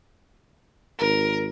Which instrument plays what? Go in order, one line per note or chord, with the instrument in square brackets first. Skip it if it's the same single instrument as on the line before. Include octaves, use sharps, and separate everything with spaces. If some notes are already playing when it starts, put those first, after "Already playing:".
[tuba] G#1 [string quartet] A#4